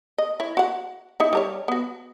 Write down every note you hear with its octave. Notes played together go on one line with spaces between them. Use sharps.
D#5
E4 C#5
F#4 F#5
D#4 E4
G3 A#4 C#5
B3 F#4